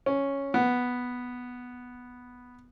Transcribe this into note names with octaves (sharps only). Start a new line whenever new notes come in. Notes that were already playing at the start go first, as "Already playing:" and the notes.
C#4
B3